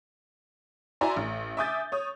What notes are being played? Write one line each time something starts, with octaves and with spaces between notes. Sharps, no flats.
E4 F#4 D5 G#5 A#5 C6
A1
E5 G#5 D6 D#6 G6 A6
C#5 D#6